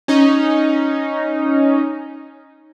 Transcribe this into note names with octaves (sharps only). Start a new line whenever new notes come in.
C#4 D#4